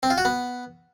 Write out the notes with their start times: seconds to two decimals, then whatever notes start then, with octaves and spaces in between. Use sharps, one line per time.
0.03 C4
0.10 F4
0.18 F#4
0.25 B3